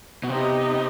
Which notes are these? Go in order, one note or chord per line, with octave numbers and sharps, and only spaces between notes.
B2
C3 B3 D#4 G4 D#5